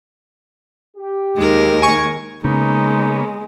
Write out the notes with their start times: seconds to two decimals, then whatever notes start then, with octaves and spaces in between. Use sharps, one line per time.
0.97 G4
1.37 D#2 G#3 A#4
1.82 G#5 C#6
2.44 C#3 G#3 A#3 B3 C#4 D#4